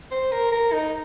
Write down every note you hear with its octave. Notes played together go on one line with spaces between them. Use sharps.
C5
A#4
A#4
D#4